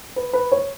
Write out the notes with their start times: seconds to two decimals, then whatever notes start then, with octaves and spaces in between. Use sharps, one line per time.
0.16 B4
0.33 B4
0.52 C#5